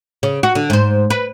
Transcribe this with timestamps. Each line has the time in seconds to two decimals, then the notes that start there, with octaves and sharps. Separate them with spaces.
0.23 C#3
0.43 F#4
0.55 D3
0.70 G#2 C5
1.10 B4